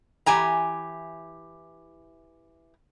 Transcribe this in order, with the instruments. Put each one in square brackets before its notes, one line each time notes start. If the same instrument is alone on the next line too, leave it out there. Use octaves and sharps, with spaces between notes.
[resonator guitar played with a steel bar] E3 G4 G#5 A#5